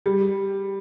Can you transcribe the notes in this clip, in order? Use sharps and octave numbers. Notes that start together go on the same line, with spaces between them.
G3